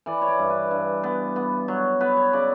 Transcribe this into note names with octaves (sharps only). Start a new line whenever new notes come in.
E3 D5
C#5
D5
G2
B4
G2
B3
B3
F#3
B3 B4
C#5
C#3 D5